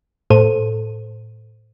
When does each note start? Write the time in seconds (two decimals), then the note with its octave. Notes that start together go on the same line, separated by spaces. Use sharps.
0.30 A2 A4 C5 D#7